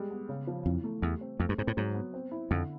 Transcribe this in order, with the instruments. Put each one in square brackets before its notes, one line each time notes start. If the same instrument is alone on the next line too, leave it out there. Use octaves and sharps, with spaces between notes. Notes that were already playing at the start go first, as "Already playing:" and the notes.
Already playing: [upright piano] G3 G#3
B3
C#3
F3
[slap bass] F2 [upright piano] E3
[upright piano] A3
[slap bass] E2 [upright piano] G3
[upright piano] C4
[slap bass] F2 [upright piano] A3
[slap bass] G2
[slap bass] G#2 [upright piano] C4
[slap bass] A2
[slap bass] G#2 [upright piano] F#3
[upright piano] B3
C4
E4
[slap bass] F2 [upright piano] D3